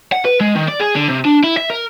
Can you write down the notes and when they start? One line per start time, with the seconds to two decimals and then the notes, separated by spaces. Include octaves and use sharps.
0.12 F#5
0.25 B4
0.41 G#3
0.56 D#3
0.69 D5
0.80 G#4
0.96 D3
1.09 C3
1.25 D4
1.44 E4
1.57 E5
1.70 A#4